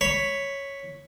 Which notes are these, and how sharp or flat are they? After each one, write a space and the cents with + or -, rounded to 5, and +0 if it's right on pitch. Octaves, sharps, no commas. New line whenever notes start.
C#5 +0 B5 +0